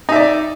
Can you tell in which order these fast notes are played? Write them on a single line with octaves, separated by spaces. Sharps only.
D#4 E5 D5